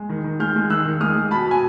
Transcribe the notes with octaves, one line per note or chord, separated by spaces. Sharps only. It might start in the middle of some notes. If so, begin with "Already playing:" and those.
Already playing: G#3
D#3
D#3
G#3 F6 G6
G#3
D#3 E6 F#6
D#3
G#3 D#6 F6
G#3
B2 A5 B5
B2 G#5